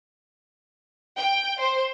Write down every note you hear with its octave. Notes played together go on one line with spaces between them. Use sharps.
G5
C5